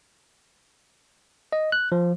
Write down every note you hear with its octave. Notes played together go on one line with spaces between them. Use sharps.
D#5
F#6
F3